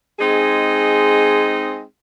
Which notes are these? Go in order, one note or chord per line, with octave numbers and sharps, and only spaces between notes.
G#3 C4 D#4 G#4